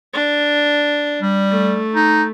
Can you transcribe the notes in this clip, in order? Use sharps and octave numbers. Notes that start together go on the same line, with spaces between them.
D4
G3
A3
D#4